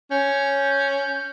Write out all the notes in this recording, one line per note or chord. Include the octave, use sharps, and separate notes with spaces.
C#4 G6